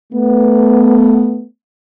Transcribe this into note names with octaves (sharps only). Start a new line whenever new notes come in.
A3 B3